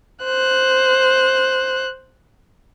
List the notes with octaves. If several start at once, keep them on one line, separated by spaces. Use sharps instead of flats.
C5 F#6